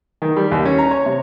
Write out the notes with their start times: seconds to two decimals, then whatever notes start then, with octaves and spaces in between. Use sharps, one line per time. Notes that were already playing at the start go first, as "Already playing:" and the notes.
0.22 D#3
0.37 G3
0.51 D#2
0.65 C#4
0.78 A#5
0.91 C#5
1.06 C3